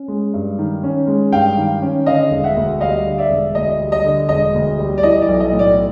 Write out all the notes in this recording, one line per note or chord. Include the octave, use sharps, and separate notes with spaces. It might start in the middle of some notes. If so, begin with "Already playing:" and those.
Already playing: C#4
G#3
G2
D#3
C#4
G#3
G2 F5 G5
D#3
C#4
D3 D#5 F5
E1
E5 F#5
D2
G3 D#5 F5
D3
D5 E5
E1
D2 D#5
G3
D#5
D3
E1 D#5
D2
G3
D5
E3 D#5
D5
B1
D#5
A2
D5